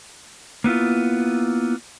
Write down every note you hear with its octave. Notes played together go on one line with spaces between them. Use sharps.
A#3 B3 E4 F4